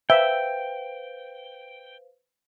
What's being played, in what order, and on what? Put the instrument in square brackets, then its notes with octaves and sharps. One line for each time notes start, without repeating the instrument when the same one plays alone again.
[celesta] B4 C5 F5 [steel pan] E5 [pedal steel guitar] G5